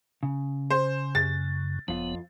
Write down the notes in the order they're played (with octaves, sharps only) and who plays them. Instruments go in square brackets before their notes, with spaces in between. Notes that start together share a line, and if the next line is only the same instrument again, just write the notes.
[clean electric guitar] C#3
[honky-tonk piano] C5
[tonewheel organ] F#2 [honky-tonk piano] A6
[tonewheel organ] F#1 B3 [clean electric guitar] F2 F4